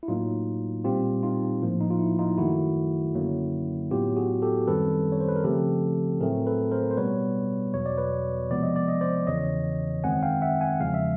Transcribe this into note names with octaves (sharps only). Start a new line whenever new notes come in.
E4
A2 F#3 A#3 D#4 F4
A#2 G3 C4 F4 G4
D#4 F4
A2 F3 A#3
D#4
F4
E4
D#4 F4
F#2 D#3 F#3 A3 E4 F#4
F#2 D3 F#3 A#3
A2 F#3 B3 F4 G4
F#4 G#4
G4 A4
F#2 D#3 G3 C4 A4 B4
C#5
C5
B4
A#4
C#3 F3 A3 C4 G4 A4
A2 F#3 A3 C4 G#4 A#4
A4 B4
A#4 C5
C5
B2 G3 B3 B4 C#5
E2 B2 F#3 C#5
D5
B4 C#5
C3 F3 G#3 B3 D5
D#5
D5
D#5
C5 D5
E2 C#3 E3 C#5 D#5
F#2 D#3 G#3 C4 F#5 G#5
F5 G5
E5 F#5
F#5 G#5
E2 C#3 F3 G#3 F5
E5